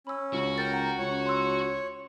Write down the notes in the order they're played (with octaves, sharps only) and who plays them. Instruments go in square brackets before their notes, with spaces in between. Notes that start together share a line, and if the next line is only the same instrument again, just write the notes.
[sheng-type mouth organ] C#4 [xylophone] B5 E6
[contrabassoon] C#2 [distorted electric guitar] F#4
[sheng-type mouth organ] A#4 G5 [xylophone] A6
[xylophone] F#5 A#5
[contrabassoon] C#2 [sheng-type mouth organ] C#5
[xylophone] C6 E6